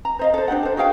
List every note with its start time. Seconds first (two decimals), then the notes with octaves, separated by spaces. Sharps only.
0.05 A#5
0.19 C5 D#5 F5
0.34 A4 C5
0.48 D4 D#4 G4 F#5
0.63 A4 C5
0.77 F#4 G#4 F5 G5